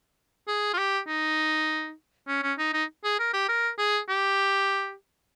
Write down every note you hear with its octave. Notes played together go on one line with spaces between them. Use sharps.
G#4
F4
G4
D#4
C#4
C#4
D#4
D#4
G#4
A#4
G4
A#4
G#4
G4